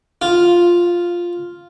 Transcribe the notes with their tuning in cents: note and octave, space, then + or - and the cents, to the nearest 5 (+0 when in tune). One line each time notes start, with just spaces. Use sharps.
F4 +0